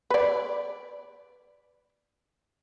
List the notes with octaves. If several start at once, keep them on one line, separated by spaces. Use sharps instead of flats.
B4 D5